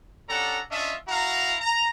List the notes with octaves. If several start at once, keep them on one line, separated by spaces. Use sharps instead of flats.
G3 C#4 D4 A4 F#5 A#5
C#4 D4 F4 D#5 E5
E4 F#4 F5 A#5
A#5